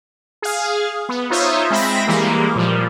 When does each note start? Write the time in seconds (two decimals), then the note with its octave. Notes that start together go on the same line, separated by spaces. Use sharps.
0.42 G#4 F5
1.09 B3
1.30 D#4 F4 C5 C#5 D#5 E5
1.71 G#3 C4 E5 B5 A#6
2.07 E3 G3 G#3 A#3
2.56 A#2 F3 G3